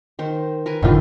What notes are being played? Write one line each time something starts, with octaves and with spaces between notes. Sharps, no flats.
D#3 C5
A#4 B4 G#5
F1 A2 D3 D#3 F4